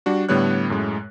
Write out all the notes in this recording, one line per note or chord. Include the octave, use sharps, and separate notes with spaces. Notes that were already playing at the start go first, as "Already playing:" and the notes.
G3 D4 F#4
A2 D3 G3 B3 C#5 F#6
F#2 A2 G#3